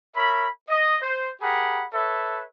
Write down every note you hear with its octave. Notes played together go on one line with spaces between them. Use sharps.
A#4 C#5 E5 B5
D#5
C5
G4 G#4 A#4 F#5 B5
A4 B4 C#5 E5